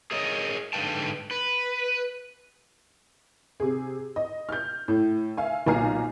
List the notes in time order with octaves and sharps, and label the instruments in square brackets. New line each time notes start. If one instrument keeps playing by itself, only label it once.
[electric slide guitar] G#4 A#4 C#5 D#5
G#2 D3 D#3 B4 G5 A5
B4
[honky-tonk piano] C3 G#4
D#5
F6 G6
A2
E5 F5 G#5
B1 A#2 G#5 A#5 F6 C7